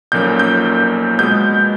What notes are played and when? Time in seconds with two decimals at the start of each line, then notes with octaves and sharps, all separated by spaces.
0.12 B1 A#2 F3 A#3 C#4 G6
0.39 G6
1.19 B2 G#3 B3 G6